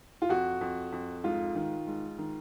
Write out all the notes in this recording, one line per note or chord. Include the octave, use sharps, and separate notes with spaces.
F4
F2 F#4
F2
F2
G#2 F4
D#3
G#2
D#3